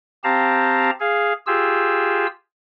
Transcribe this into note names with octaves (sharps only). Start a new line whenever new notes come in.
C4 G4 F5 A5 A#5
G#4 F5
F4 G4 G#4 E6